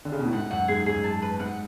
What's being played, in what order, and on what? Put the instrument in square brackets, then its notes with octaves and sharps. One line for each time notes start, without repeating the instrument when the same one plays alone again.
[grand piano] D3
C#3
B2
A2
[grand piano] G#2 [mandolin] F#5
[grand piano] F#2 [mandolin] F#5
[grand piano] G#2 [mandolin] G#4
[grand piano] F#2 [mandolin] G#4
[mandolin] A5
B4
[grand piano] G#2 [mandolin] F#5